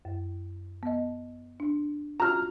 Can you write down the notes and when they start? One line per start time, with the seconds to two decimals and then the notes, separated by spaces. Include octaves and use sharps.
0.05 F#2
0.83 B3 D#5
1.60 D4
2.20 F4 F#4 A#5 F6